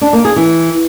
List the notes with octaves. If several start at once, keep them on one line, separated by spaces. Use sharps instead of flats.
D4
A#3
G#4
E3